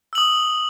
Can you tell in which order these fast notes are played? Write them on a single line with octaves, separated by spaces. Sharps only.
E6 F#7 D#6